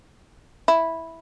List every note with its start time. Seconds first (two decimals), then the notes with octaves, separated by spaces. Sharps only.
0.68 E4